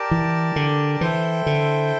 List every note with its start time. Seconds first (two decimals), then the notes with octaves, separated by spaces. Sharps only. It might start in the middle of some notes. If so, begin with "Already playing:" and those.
Already playing: G4 A#4 D5 A5
0.11 E3
0.56 D3
1.01 E3 E4 A4 C5 G5
1.46 D3